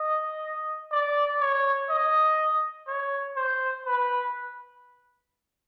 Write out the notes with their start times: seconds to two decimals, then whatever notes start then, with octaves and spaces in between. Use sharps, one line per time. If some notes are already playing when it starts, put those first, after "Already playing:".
Already playing: D#5
0.92 D5
1.41 C#5
1.90 D#5
2.87 C#5
3.37 C5
3.86 B4